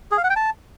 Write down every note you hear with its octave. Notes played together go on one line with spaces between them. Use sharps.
G#4
F5
F#5
G5
A5